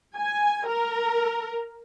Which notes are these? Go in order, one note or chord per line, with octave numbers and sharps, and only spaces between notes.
G#5
A#4